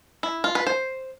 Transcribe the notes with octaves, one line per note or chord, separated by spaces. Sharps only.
E4
F4
B4
C5